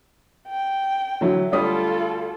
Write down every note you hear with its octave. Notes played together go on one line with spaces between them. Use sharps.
G5
D3 F#3 E4
D2 G3 F4 A4 D#6